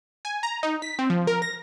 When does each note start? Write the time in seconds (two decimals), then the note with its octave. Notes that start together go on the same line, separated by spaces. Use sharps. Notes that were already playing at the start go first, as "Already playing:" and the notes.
0.25 G#5
0.43 A#5
0.63 D#4
0.82 B6
0.99 C4
1.10 F3
1.27 A#4
1.42 A#6